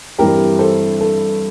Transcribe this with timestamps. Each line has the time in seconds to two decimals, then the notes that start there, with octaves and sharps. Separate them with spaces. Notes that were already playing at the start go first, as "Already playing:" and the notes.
0.18 G2 E3 G3 C4 E4 G4 A#4
0.59 A4 C5
1.01 A4